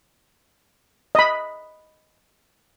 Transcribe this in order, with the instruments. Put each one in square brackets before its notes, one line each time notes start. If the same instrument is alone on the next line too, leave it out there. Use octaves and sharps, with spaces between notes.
[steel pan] D#5 B5